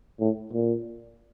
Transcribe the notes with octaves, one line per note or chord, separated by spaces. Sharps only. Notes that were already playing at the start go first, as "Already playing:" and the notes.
A2
A#2